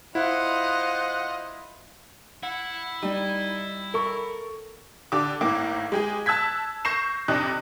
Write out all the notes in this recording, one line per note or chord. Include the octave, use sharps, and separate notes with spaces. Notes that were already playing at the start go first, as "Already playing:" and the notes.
E4 F4 C5 D#5 F#5 F#6
E4 F#5
G3 D#4
A4 A#4 C#6
D3 G4 D6
G#1 A2 A#3 D6
G#3 G4 G#4
A5 E6 F#6 G#6 B6
C#6 G6 A#6 C7 E7
F2 C3 D4 D#4 D#5 F#6